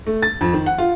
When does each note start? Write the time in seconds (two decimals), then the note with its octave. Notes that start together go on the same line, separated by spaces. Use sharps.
0.07 A3
0.23 A6
0.41 F2
0.53 D#3
0.66 F#5
0.78 F4